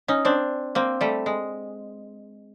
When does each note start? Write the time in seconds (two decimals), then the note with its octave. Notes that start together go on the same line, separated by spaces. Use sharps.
0.08 C#4 D#4
0.25 C4 D4
0.75 A#3 C4
1.01 G3 A3
1.26 G#3